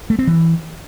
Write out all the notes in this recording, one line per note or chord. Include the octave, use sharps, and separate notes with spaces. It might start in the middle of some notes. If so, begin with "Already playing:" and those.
A3
C4
E3